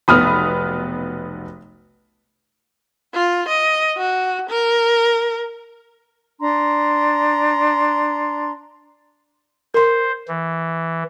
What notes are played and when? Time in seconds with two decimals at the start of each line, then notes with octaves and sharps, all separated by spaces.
0.08 F1 B1 B3 B5 D#6 F6
3.14 F4
3.48 D#5
3.97 F#4
4.50 A#4
6.41 D4 A#5 C6
9.74 A#4 C5 C6
10.28 E3